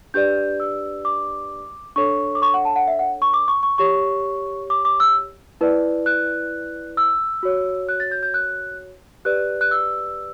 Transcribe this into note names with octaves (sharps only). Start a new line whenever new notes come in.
D4 G4 B4 D5 G6
E6
D6
D4 A4 C#5 C#6
D6
C#6
F#5
A5
F#5
E5
F#5
C#6
D6
C#6
C#6
G4 C#5 C#6
D6
D6
E6
E4 B4 D5
F#6
E6
F#4 C#5
F#6
A6
G6
G6
F#6
G4 B4 D5 F#6
F#6
E6